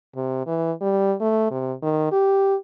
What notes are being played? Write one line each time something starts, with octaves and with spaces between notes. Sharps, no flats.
C3
E3
G3
A3
C3
D#3
G4